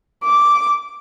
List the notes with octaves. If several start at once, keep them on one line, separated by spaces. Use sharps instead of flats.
D6